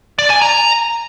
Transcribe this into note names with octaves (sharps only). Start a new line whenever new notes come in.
D5
G#5
A#5